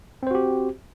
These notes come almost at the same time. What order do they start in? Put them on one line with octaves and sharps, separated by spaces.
C4 C5 F#4 G4